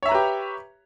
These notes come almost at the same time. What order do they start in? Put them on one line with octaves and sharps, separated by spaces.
C#5 E5 A#5 B4 G4